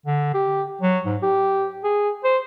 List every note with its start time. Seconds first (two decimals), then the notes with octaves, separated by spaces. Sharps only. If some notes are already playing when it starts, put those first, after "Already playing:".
0.06 D3
0.34 G4
0.81 F#3
1.06 G#2
1.23 G4
1.84 G#4
2.24 C5